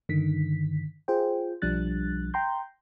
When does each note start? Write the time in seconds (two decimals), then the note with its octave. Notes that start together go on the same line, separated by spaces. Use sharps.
0.09 G2 D3 D#3 B6
1.08 F4 G#4 C5 G5
1.62 B1 F3 G3 D4 F#6 A6
2.34 G5 A#5 C6 G6